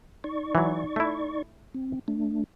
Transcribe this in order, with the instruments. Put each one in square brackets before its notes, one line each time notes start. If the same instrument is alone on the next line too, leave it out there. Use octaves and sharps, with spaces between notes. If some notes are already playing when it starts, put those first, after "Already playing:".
[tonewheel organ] D#4 D5 C#6
[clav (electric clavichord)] E3 F#3
A3 E4
[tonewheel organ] C4
A3 D4